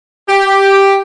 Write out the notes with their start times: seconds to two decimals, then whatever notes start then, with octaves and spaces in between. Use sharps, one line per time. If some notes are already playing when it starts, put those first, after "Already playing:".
0.29 G4